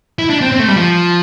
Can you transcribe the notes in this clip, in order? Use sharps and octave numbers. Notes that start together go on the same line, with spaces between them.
E4
D4
C4
C4
A3
G3
F3